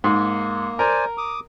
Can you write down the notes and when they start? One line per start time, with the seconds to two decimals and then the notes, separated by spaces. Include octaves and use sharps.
0.04 G#2 A#3
0.79 A#4 C5 D5 G#5
1.18 D6 D#6